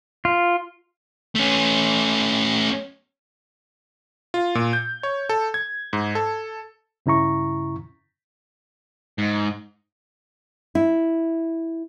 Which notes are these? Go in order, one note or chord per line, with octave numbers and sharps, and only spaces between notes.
F4
A3 C#4
F4
A#2
G6
C#5
A4
G#6
G#2
A4
G2 C#3 E4 A#5 C#6
G#2
E4